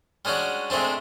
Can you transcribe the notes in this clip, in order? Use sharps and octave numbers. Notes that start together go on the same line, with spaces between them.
G3 G#3 C#4 D4 F#4
C3 G#3 A3 C4 D4